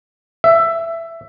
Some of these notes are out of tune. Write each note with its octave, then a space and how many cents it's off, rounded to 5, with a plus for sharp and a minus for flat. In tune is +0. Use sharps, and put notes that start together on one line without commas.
E5 +10